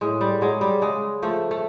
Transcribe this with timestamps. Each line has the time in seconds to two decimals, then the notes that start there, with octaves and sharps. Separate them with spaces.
0.01 A2 G#3
0.21 G3
0.41 F#3 G#3
0.61 G3
0.81 C#3 G#3
1.22 F3 A3
1.51 A3